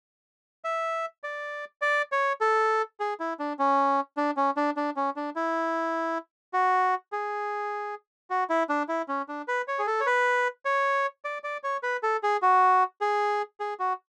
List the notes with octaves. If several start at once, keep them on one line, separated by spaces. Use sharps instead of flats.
E5
D5
D5
C#5
A4
G#4
E4
D4
C#4
D4
C#4
D4
D4
C#4
D4
E4
F#4
G#4
F#4
E4
D4
E4
C#4
D4
B4
C#5
G#4
A4
C#5
B4
C#5
D5
D5
C#5
B4
A4
G#4
F#4
G#4
G#4
F#4